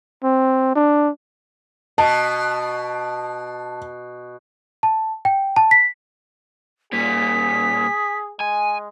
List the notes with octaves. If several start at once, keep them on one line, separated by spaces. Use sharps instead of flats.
C4
D4
B2 A5
A5
G5
A5
B6
A#2 G3 G#4 B6
G#3 G#5